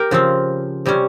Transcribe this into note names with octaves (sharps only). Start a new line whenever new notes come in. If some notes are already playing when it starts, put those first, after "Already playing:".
Already playing: G4 A#4
C#3 F3 C4
C3 G3 C#4